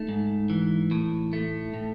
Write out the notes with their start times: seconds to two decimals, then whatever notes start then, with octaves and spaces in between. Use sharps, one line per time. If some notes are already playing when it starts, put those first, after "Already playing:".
Already playing: A3 D#4
0.09 G#2
0.50 E3
0.91 A2
1.33 A3
1.74 A2